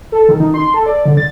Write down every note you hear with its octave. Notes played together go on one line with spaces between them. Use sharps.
A4
D#3
D#4
C6
A4
D5
D3
A6